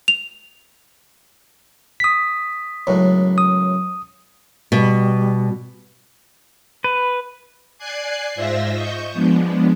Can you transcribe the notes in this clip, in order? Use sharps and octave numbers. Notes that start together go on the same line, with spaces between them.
F7
D#6 B6
C#2 F#2 A2
D#6
B2 G3
B4
D5 G#5 F#6 G#6 C7
G#2 F4 C5 E5 E6 A#6
D#5 C#6 G6
F3 G#3 B3 D4